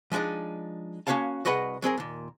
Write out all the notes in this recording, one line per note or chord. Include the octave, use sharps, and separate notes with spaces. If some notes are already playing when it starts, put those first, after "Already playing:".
F3 G#3 B3 D4 D#4
A#3 C#4 F#4 C#5 F5 A5
C2 F#4 G#4 B4 D#5 F#5
F#3 C4 G#4 A#4
D#2 A#2